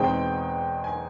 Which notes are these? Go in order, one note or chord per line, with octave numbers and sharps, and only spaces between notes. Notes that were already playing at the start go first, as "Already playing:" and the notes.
Already playing: E2 B2 G#3 C4 D#4 G5
G#5